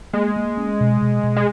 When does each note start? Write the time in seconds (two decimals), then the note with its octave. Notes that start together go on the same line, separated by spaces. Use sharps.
0.13 G#3 A#3
0.36 A#3
0.57 C#4
0.80 B2
1.02 B2
1.23 B2
1.36 G#3